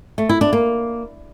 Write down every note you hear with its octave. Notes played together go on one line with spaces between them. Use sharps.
A3
E4
D4
A#3